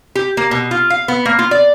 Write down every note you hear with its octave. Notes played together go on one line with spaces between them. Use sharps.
G4
A#3
B2
F4
F5
B3
A#3
F4
D5